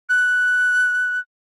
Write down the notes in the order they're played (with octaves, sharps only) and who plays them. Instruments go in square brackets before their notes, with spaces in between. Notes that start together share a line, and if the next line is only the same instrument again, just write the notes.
[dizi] F#6